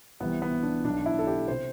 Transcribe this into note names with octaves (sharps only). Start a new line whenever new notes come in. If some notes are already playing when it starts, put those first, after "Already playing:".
C2 C3 E3 B3
B3
D4
B1 B2 D4
E4
A4
G4
C3 C5